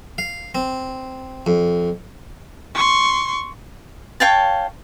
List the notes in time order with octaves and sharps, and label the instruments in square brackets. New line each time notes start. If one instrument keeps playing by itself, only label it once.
[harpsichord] F5
C4
F2
[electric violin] C6 C#6
[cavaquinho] C#5 F5 G5 A5